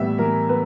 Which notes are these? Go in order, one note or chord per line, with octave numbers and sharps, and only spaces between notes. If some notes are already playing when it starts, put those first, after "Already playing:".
Already playing: A2 E3 G3 B3 E5
E3 A#4
B3 B4